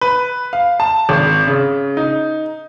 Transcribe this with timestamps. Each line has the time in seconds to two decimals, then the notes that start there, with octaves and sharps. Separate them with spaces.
0.01 B4
0.53 F5
0.80 A5
1.09 G#1
1.47 C#3
1.97 D#4